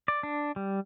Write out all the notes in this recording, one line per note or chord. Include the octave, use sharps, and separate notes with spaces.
D5
D4
G3